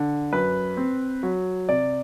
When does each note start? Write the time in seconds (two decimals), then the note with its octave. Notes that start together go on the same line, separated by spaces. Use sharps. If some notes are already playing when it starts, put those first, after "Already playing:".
Already playing: D3
0.32 F#2 B4
0.77 C4
1.23 F#3
1.69 C3 D5